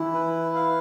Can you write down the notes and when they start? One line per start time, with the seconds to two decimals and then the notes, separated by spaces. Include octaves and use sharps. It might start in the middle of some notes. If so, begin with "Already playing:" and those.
Already playing: E3 E4
0.14 B4
0.55 F5